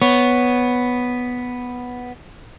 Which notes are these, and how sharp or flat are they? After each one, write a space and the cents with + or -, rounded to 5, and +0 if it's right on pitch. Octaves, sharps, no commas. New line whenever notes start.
B3 +0 C#5 +0